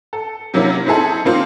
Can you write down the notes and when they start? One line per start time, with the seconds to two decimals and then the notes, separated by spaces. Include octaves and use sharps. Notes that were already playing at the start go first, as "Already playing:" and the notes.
0.13 A4
0.54 C3 F#3 A#3 C#4 E4
0.86 C4 D#4 E4 G#4 A4
1.25 D#3 A#3 C4 C#4 F4